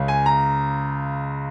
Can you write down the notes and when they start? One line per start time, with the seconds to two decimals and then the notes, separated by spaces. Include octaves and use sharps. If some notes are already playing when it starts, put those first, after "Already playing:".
Already playing: C#2 C#3
0.08 G#5
0.26 A#5